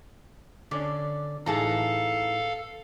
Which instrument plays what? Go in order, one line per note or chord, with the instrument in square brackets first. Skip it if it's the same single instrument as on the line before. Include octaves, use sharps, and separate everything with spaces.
[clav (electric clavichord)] D3 C#4 D4 [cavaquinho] D5
[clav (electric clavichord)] A1 E3 D#4 [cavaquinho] G#4 A5 A#5 [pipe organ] A4 F5